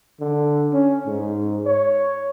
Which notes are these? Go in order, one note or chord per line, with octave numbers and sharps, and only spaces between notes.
D3
C#4
G#2
C#5